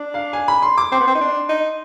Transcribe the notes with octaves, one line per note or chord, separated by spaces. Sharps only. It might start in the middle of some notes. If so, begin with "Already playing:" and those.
Already playing: D4
F5
G#5
B5
C6
D6
C4 C6
B3
C4
D#4
D4
D#4